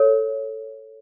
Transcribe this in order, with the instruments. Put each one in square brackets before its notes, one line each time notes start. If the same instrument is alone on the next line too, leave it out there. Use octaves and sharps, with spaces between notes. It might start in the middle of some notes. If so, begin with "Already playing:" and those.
Already playing: [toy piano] A4 C#5